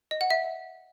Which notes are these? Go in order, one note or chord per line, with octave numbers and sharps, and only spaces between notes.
D#5
F#5
E5